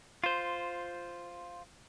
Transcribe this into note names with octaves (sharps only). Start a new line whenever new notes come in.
F4 C5